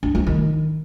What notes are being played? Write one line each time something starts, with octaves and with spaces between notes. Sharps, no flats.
D4
F3
D#3